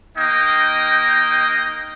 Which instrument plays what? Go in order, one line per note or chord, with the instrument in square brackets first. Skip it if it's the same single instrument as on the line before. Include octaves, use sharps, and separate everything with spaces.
[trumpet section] A#3 D#4 D#5 G5